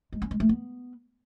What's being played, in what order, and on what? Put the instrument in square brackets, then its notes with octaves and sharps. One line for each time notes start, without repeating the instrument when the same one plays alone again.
[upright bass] G#3
C#4
G#3
A3
B3